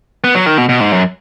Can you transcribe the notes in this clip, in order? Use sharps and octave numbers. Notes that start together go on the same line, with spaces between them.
B3
F#3
D#3
B2
B2
G#2
F#2